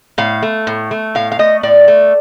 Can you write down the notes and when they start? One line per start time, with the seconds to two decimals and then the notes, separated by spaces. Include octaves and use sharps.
0.18 A2 F5
0.42 A3
0.67 A2
0.91 A3
1.15 A2 F5
1.32 F5
1.39 A3 D#5
1.63 A2 D5
1.88 A3